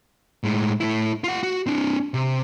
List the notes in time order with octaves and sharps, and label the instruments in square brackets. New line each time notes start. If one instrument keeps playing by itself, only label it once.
[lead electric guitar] A2 G#3
A3 E4
F4 F#5
F#4
C4 D4
C3